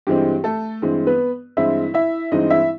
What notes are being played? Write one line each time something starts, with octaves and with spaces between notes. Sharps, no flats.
G2 E3 G#3 C4 G4
A3 A4
G2 E3 G#3 C4
B3 B4
G2 E3 G#3 C4 E4 E5
E4 E5
G2 E3 G#3 C4 D#4 D#5
E4 E5